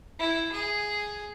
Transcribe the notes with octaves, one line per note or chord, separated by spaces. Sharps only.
E4
G#4